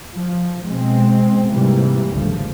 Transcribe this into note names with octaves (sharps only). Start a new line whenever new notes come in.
F3
B2 G#3 C4
G#2 C3 E3 G3 A#3
G#1 D2 C#3 F3 A3